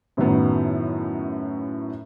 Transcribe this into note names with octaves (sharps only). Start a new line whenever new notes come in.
F#2 A2 D#3 F#3 B3